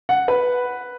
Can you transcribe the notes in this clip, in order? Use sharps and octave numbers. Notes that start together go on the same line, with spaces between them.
F#5
B4